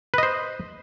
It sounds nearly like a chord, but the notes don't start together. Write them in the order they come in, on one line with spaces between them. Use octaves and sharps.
B4 D#5 C5